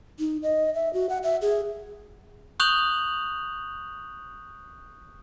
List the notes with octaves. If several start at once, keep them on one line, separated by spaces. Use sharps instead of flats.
D#4
D#5
E5
F#4
F#5
E5
G#4
C#6 D#6 F#6 G6 F7 F#7